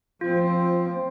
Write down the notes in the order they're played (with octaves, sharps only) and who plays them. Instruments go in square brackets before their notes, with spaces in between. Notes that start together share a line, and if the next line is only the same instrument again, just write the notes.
[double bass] F3 C4 [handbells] F4